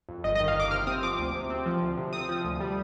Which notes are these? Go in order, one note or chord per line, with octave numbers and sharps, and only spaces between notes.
F2
G1 D#5
D#5
D#3
F5
G1 D6
C3 F6
C4 D#6
F3 D6
D2
C3
C4
F3
D2
C3
C4 D#6
F3
D2
G3